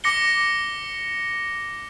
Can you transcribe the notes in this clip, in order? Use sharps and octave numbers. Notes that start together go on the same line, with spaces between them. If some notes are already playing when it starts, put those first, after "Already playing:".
D6 A#6 C#7 G7